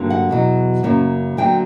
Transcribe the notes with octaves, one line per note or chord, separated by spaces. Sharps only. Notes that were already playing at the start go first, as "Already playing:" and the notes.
Already playing: G2 D3 F#3 A#3
F#5
E2 B2 F#3
F#2 C#3 F#3 A#3
D2 D3 F#3 A#3 G5